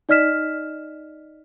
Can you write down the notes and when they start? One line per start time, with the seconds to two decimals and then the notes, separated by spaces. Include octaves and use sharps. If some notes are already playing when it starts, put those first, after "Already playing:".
0.09 D#4 D5 D#5 F6 B6 E7